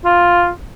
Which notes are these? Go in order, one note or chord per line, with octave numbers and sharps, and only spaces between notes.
F4